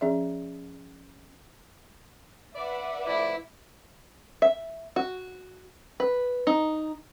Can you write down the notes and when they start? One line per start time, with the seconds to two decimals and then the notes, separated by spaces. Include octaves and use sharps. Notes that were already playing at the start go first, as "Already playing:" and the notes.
0.01 F3 C#4 G#4 D5 E5
2.55 B4 D5 E5 F#5
3.07 F3 A3 E4 D5
4.42 E5
4.96 F#4
6.00 B4
6.47 D#4